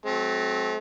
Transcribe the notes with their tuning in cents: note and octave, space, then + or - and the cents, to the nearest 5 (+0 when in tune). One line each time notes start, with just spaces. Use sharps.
F#3 +0 A3 -40 C4 +0